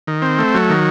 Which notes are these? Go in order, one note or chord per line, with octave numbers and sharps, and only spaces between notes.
D#3
C4
A3
F#3
D#3